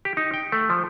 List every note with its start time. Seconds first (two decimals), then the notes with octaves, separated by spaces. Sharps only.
0.05 G4
0.17 D#4
0.34 G5
0.52 A3
0.70 F3